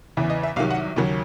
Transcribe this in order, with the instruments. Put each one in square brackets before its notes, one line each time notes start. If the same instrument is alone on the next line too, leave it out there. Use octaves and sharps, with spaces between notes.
[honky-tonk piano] E2 C#3 E3
D#5
E5
C2 C3 D#3 F#3 F5
F#5
D#2 C#3 F#3 A#3